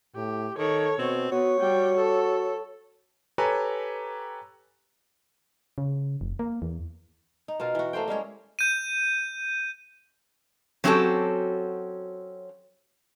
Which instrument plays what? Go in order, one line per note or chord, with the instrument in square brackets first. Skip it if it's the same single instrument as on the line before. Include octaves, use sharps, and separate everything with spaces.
[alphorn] A2 [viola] G4
[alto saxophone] D#3 [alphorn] A4 [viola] C#5
[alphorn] B2 [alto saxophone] C4
[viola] B3 [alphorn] F#4 [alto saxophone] C#5
[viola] G3 G5 [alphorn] F#4
[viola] A4
[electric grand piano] G4 A4 B4 C#5 G#5 A#5
[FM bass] C#3
F1
A#3
E2
[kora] D#4
B2 F4 A#4
E3 F#4
A3 A#3 C5 G5
G3 G#3 C#4 G#4
[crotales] G6 D#7
[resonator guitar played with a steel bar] F#3 C4 C#4 F#4 G4 A4